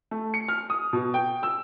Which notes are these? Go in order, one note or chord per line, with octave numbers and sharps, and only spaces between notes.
A3
C#7
F6
D#6
B2
G5
E6